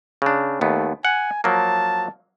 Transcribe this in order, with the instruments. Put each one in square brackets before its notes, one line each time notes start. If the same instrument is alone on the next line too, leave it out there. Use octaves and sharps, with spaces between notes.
[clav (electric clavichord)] C#3 D4
[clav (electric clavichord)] D#2 B3 [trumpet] A3
[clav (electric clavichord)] F#5 [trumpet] G#5
[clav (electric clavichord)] F3 F#3 A#3 [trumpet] A5